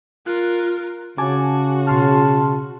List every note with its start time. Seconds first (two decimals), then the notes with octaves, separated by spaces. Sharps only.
0.27 F4 A#4 F#6
1.18 C#3 F#4 G#5 A5 D6
1.87 B2 A5 C6 F6